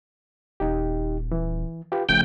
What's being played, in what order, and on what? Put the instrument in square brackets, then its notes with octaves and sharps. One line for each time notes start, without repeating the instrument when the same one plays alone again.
[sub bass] D#1 [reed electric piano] D#2 D#4 G4
[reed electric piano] E3
F4 G4 B4
[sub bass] F#1 [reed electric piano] C#3 F3 A3 [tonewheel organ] G5